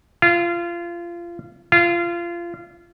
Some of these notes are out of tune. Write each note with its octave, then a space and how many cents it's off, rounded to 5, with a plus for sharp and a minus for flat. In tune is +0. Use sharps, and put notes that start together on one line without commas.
F4 -25
F4 -25